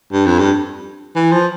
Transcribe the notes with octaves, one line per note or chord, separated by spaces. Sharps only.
G2
F2
G2
E3
F3